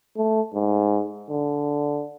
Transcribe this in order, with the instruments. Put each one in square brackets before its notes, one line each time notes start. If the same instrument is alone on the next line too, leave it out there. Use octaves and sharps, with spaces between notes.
[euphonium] A3
G#2
D3